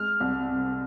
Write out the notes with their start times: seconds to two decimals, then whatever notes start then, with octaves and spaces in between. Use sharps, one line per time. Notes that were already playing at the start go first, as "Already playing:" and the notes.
Already playing: G#3 F6
0.20 C2
0.50 C3